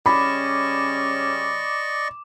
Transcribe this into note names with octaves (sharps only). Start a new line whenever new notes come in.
C#3 G3 C#4 D5 D#5 B5 C#6 D6